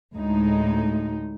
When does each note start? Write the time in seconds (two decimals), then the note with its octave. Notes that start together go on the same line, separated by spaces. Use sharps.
0.14 D2 A2 G#3 D#4